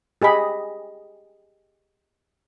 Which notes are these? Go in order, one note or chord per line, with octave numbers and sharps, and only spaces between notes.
G4 G#4 D#5 B5